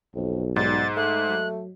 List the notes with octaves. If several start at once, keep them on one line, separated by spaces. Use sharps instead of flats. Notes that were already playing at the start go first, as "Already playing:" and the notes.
B1 F2
G#2 G3 A6
A3 F#6
F#3